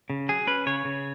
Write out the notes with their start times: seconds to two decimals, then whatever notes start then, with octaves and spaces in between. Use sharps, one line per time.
0.10 C#3
0.29 F#3 G#4
0.47 C#4 B4
0.66 C#3 C#5
0.85 C#3